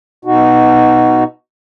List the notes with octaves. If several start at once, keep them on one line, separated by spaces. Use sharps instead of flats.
B2 D#4 F#4